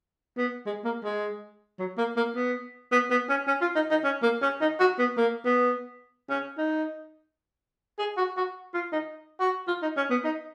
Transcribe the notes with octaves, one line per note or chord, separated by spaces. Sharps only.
B3
G#3
A#3
G#3
F#3
A#3
A#3
B3
B3
B3
C#4
C#4
F4
D#4
D#4
C#4
A#3
C#4
D#4
F#4
B3
A#3
B3
C#4
D#4
G#4
F#4
F#4
F4
D#4
F#4
F4
D#4
C#4
B3
D#4